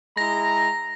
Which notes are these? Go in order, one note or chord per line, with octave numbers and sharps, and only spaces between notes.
G#3 E4 A#5 A#6